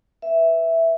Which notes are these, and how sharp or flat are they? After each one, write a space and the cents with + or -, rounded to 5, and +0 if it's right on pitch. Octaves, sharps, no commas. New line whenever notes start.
B4 +0 E5 +0